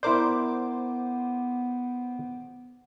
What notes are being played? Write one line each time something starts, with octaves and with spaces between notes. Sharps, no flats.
B3 E4 A#4 C5 D5 D6